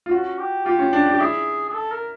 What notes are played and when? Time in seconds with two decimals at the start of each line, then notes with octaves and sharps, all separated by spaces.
0.06 F4
0.11 C#4 F#4
0.39 G4
0.66 F4 G4
0.79 C#4
0.93 D4
1.06 D4
1.12 G4
1.20 E4 G#4
1.69 G#4
1.74 A4
1.91 A#4